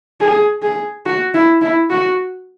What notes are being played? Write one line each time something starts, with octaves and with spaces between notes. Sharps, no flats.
G#4
G#4
F#4
E4
E4
F#4